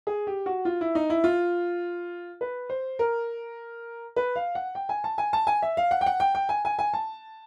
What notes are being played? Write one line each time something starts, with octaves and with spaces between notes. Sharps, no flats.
G#4
G4
F#4
F4
E4
D#4
E4
F4
B4
C5
A#4
B4
F5
F#5
G5
G#5
A5
G#5
A5
G#5
E5
F5
F#5
G5
F#5
G5
G5
G#5
G#5
G#5
A5